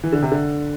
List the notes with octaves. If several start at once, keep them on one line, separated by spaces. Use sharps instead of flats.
E3
D3
C3
D3